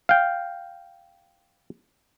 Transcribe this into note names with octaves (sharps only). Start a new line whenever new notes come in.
F5 G5